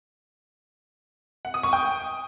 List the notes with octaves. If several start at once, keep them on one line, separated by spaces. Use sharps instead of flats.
F#5
D#6
C#6
G5